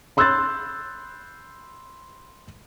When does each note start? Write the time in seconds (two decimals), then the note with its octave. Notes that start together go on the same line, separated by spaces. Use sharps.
0.17 B5 C6 E6 F#6 G6 A6